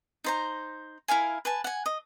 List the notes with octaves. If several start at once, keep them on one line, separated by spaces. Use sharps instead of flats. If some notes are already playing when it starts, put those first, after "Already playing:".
D#4 C5 A#5
E4 A#4 F5 G#5
B4 G#5 A5
F#5 G#5
D#5